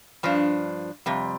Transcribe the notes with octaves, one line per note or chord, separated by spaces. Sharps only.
G2 F3 D4
F2 C3 G3